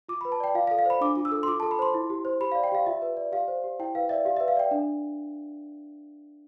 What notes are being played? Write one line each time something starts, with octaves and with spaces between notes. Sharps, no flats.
F4 D6
B5
B4
A5
D5 G5
F4 F5
F5
A4
F5
C5 B5
D4 D6
F4 D6
E6
A4
C6
F4 D6
A4 A5
B5
C5 C6
E4
G4
C5
G4 B5
F5
D5
G5
G4 F5
F4 E5
B4
D5
G4 F5
C5
G4
E4 G5
B4 F5
D5 E5
G4 F5
E5
B4
F5
D5 G5
D4